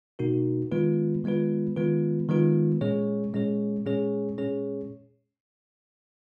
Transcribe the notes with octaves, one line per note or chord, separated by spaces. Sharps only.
B2 A#3 D#4 F#4 A#4
D#3 G#3 B3 F4 B4
D#3 G#3 B3 F4 B4
D#3 G#3 B3 F4 B4
D#3 G#3 B3 F4 B4
A#2 G#3 C#4 G#4 C#5
A#2 G#3 C#4 G#4 C#5
A#2 G#3 C#4 G#4 C#5
A#2 G#3 C#4 G#4 C#5